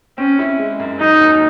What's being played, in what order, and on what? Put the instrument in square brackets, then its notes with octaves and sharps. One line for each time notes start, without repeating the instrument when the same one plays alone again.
[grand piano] C4 [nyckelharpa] C#4
[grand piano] E4
G#3
F#2
[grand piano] F#3 [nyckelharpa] D#4
[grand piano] D#2